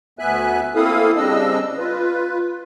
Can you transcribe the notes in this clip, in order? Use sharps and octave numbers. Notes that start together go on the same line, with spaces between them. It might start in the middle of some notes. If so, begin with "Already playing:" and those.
D2 B3 E5 G#5 F#6
A#3 C4 E4 A4 F5 D#6
C#3 G3 C4 D4 D#5 E6
F4 B4